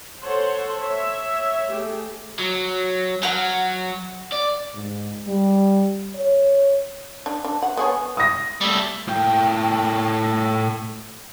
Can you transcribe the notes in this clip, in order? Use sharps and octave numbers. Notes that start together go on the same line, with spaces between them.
A4 C5 C#5 F#5 C6
C#5 E5
A3 G4 G#4
F#3
F#3 F#5 F6
D5
G#2
G3
C#5
D4
D4
F#5
B3 G#4 C#5
D#6 A#6
G3 A3
A2 G5